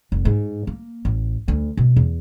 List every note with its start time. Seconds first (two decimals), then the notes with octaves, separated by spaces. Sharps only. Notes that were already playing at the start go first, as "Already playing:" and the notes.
0.12 F1
0.25 G#2
0.67 A#3
1.05 A1
1.48 D2
1.77 B2
1.96 E2